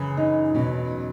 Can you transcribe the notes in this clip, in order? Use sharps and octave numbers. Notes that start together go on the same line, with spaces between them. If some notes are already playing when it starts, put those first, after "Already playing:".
Already playing: F#2 C#3 E3
D#4
E2 B2 F#3 C#4